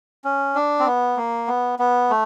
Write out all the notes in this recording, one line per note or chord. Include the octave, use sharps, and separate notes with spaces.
C#4
D4
C4
B3
A#3
B3
B3
A3